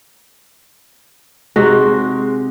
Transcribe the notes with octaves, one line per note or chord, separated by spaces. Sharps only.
C3 G#3 D#4 F#4